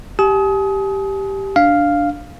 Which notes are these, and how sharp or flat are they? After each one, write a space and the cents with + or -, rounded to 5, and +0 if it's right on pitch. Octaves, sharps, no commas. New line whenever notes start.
G4 +0 G#5 +40 D#6 +30
D4 +0 F5 +0